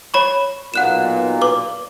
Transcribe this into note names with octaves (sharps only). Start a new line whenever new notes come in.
C#5 B5 C#6
B1 A#2 F#5 F#6 E7
B4 D6